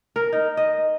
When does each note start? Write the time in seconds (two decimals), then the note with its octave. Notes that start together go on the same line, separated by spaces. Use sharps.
0.16 A#4
0.33 D#4
0.57 D#5